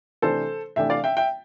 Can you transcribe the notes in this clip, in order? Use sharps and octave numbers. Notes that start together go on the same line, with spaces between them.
C3 E3 A3 D4 A4 C5
C3 E3 A3 D4 E5 G5
D5 F5
E5 G5
E5 G5